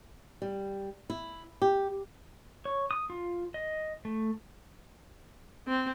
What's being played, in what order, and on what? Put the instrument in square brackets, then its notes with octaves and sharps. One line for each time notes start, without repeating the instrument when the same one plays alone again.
[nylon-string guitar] G3
E4
G4
[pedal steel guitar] C#5
D#6
F4
D#5
A3
[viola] C4